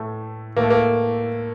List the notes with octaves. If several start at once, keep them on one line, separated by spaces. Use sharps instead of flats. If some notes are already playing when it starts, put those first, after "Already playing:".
Already playing: A2 A3
A2 A#3
A3
A#3